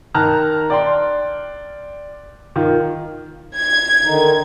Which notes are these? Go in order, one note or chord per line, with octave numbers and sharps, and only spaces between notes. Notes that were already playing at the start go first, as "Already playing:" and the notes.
D#3 A5 A#5 F6 F#6
D5 G5 C6
D#3 F4
G#6
D3 D#3 D#4